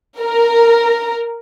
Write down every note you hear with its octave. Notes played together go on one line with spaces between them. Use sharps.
A#4